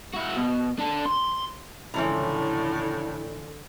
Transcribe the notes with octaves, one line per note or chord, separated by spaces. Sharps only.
E4 F#4
B2
D4 A4
C6
C#2 A2 D3 E3 F3 C#4 E5 A#5